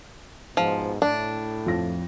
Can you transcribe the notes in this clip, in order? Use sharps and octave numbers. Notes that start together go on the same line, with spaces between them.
G#2 B2 F3
A2 D4
F2 F3 A#6